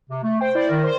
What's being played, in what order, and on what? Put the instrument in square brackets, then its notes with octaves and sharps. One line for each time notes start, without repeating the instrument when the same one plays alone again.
[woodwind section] C3
A3
[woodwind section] C5 [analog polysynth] G5
[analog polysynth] E4 D5
[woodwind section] D#3 A#4
[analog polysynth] C5 C6